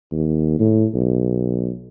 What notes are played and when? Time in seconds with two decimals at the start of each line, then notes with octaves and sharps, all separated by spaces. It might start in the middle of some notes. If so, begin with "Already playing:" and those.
0.12 D#2
0.59 A2
0.95 B1